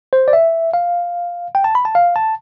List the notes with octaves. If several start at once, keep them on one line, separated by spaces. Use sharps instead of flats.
C5
D5
E5
F5
G5
A5
B5
A5
F5
A5